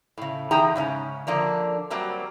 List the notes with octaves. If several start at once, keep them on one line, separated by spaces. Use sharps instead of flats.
A2 C#3
E2 D#4 G#4 G5 A#5
G#2 C#3 C#4
D3 F3 A#3 D4
F#3 G3 A#3 C4